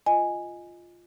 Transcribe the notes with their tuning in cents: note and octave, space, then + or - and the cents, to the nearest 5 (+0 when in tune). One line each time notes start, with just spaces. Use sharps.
F4 +0 D#5 +0 G#5 -5